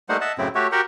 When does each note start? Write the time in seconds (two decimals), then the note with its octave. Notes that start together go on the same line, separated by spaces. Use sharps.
0.09 G3 A3 A#3 D#4 C5 F#5
0.21 D#5 E5 F#5 A5
0.38 F#2 A2 C#3 C4 E4
0.55 A3 F#4 G4 C#5 E5
0.72 F#4 G4 A#4 F#5 G5